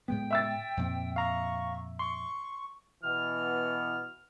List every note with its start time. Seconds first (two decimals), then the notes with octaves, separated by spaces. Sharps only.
0.08 A2 G#3 B3 G5
0.31 E5 E6 A6
0.77 F2 A#2 C4
1.16 F5 A#5 C#6
1.99 C6 C#6
3.03 B2 E3 B3 F6